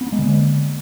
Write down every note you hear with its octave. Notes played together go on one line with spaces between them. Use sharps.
B3
A#3
G#3
D3